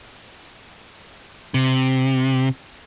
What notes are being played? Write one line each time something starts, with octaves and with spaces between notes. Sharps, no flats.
C3